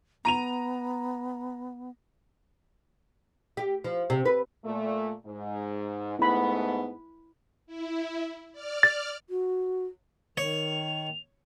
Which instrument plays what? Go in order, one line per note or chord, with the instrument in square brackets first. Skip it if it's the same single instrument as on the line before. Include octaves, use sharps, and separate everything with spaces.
[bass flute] B3 [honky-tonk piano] A#5 D#7 F7
[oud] G4
F3
C3
B4
[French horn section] A#2 A3
G#2
[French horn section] G#2 A3 B3 [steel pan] E4 B5
[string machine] E4
D5 F6
[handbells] A6
[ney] F#4
[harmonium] D#3 [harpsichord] C#5 [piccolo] F7